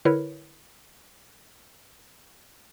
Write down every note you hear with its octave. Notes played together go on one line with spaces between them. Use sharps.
D3 E4 A#4 B4 C#5